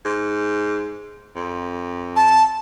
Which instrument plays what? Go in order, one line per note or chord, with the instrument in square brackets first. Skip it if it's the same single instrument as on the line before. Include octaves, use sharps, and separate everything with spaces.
[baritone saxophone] G#2
F2
[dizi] A5